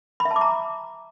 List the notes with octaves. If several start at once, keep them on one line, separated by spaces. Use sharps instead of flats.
B5
E5
A5
D6
A#5